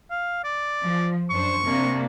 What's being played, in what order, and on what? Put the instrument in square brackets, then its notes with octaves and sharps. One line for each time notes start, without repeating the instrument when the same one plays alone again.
[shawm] F5
D5
[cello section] F3
[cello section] F#2 D4 C5 [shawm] C#6
[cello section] C3 A#3 D4